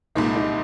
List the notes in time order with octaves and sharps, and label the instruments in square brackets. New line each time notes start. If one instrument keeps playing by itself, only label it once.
[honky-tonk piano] C2 A#2 G#3 [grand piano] D#4
[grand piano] D#4